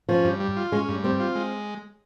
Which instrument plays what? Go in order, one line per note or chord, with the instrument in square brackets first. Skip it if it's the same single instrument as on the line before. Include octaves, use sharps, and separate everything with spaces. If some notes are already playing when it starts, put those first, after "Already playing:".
[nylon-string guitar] F3 [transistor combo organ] C#4
[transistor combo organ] G2
G3
F4
[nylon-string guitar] G#3 [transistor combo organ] C#4
[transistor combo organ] G2
[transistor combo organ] G3 [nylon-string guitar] C4
[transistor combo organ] F4
G#3